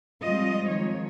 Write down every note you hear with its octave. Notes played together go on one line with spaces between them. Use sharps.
F3 G3 G#3 C4 F4 D#5
D#3 F3 G#3 C#5